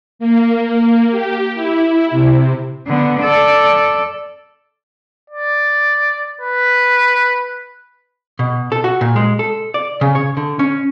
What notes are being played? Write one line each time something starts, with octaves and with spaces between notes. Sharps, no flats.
A#3
G4
E4
C3
D3 B3
A4 D5
D5
B4
B2
A4
F#4
A#2
G#3
A4
D5
C#3
C#5
D3
C#4